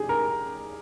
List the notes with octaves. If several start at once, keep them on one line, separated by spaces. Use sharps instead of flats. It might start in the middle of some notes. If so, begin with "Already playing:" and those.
Already playing: G4 G#4
A#4